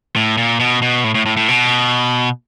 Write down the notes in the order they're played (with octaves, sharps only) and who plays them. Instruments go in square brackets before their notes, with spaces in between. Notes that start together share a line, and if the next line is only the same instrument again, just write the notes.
[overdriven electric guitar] A2
A#2
B2
B2
A2
A2
A2
A2
B2